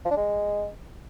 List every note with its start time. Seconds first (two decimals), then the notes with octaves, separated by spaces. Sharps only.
0.05 F3
0.11 D4
0.16 G#3